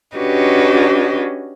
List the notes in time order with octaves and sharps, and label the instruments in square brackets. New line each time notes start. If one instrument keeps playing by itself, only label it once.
[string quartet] C#4 D4 F#4 G4 B4 D#5